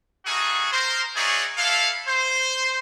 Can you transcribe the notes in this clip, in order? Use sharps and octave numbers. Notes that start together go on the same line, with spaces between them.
G3 A3 D#4 F#4 G#4
A#4 C5
D#4 E4 F#4 G#4 C#5 D5
D4 E4 F4 A4 F5
C5